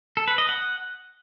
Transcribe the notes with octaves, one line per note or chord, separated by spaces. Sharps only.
A4
B4
D#5
F#5